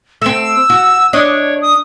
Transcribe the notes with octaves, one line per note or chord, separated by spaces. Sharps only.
A3 C4 E6
F#4
D4 C#5 D#5
D#6